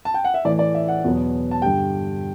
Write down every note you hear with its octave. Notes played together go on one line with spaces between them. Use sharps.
A5
G5
F#5
E5
A2 E3 A3 D5
D5
E5
F#5
E2 B2 F#3 B3
A5
G2 D3 G3 G5